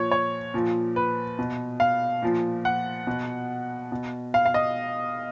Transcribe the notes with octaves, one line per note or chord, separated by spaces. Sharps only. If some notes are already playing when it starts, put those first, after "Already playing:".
Already playing: A#2 F3 C#5
C#5
A#2 F3
B4
B2
F5
A#2 F3
F#5
B2
B2
F5
F5
D#5